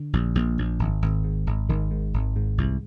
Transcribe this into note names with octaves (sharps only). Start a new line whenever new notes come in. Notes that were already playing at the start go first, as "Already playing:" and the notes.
Already playing: D3
A#1
A#1
A#1
G#1
G#1
G#2
G#1
G#1 D#3
G#2
G#1
G#2
C2